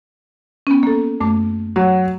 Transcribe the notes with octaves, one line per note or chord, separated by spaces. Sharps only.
B3 C#4
A#3 A4
F#2 A3 D6
F#3